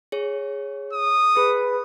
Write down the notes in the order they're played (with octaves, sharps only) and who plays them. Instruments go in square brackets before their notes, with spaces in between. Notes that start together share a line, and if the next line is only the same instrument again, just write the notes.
[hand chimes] G#4 C#5
[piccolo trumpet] D#6
[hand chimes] G#4 [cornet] B4